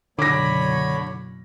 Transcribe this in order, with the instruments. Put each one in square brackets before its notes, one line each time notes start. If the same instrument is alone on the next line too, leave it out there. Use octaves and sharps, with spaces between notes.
[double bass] F#1 B2 [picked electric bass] D3 [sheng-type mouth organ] C#5 B5 [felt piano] D6 A#6